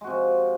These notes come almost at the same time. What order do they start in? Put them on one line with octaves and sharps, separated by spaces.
G#3 F#4 C3 F3